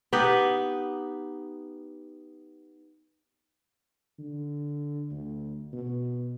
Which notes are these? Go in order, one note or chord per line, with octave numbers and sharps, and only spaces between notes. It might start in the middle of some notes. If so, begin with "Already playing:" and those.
B3 D#4 G4 B4
D3
D2
B2